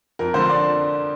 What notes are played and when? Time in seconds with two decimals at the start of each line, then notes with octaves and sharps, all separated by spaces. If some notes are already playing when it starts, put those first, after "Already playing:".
0.19 F2 A#4
0.34 D3 F3 C5
0.49 D5